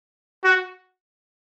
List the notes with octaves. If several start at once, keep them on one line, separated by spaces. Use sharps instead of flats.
F#4